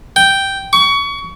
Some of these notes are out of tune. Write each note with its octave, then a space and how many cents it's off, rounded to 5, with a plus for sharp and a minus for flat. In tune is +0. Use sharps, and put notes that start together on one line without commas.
G5 -5
C#6 +25